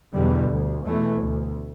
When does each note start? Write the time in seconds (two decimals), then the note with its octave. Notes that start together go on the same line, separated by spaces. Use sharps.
0.13 E2 B2 D3 G3
0.49 D2
0.86 E2 B2 E3 A3
1.22 D2